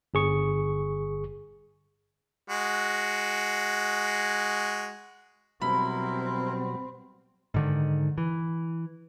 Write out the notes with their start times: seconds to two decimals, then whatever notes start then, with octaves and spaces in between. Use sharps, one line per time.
0.14 G1 G#4 C#6
2.49 G#3 F#4
5.62 B2 F#3 G3 C4 E4 A#4 B5
7.54 G#2 D3 D#3
8.18 E3